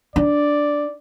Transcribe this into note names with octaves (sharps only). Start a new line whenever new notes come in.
D4 D5